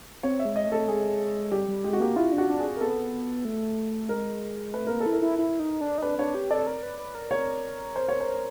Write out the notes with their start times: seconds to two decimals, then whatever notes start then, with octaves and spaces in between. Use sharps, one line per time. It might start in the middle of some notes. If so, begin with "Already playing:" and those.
0.23 C4 C#5
0.39 E5
0.45 G#3
0.56 D#5
0.66 A3
0.72 A4
0.87 G#3 G#4
1.52 G3 G4
1.68 G3
1.84 G#3 G4
1.93 F#4
2.00 A#3 G4
2.16 E4 F4
2.32 D4
2.38 F#4
2.49 D4
2.59 G#4
2.77 A#4
2.81 B3 A4
3.45 A3
4.09 G#3 A#4
4.74 A3 B4
4.87 A#3 A#4
5.00 A4
5.06 E4
5.13 A#4
5.22 E4
5.38 E4
5.59 D#4
5.81 D4
5.98 D#4
6.02 D4 B4
6.18 D4 C#5
6.35 G4
6.51 A4 D5
6.67 A#4
6.83 B4
6.99 B4
7.15 A#4
7.31 C#5
7.96 C5
8.08 C#5
8.20 C5